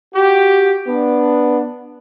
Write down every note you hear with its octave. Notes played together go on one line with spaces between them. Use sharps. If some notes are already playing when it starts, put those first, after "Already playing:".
F#4 G4
B3 D4